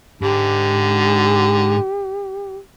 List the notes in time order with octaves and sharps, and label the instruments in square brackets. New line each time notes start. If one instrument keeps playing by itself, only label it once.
[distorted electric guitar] G#2 [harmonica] D3 [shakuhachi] G4